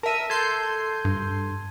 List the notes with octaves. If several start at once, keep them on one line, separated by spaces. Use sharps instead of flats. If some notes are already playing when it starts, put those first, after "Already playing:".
A#4 E5 A5 D#7
A4 C6 G6 G#6
G2